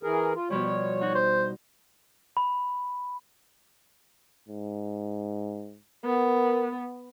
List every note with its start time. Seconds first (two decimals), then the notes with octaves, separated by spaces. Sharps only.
0.03 E3 G#4 A#4
0.35 F4
0.50 B2 F3 G3 C#5
1.01 D#4 F#4
1.15 C5
2.37 B5
4.48 G#2
6.05 B3 A#4